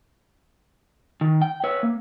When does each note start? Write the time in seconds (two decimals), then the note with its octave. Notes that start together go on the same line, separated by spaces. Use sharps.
1.21 D#3
1.42 G5
1.64 B4 C#5 E5
1.83 A#3